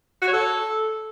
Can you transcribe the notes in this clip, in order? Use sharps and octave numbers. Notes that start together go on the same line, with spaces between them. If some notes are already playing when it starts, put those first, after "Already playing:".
F#4
C#5
A4